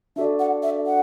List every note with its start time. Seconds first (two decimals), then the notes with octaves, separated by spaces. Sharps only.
0.16 D4 F#4 A4 D5 E5
0.39 F#5
0.62 E5
0.86 F#5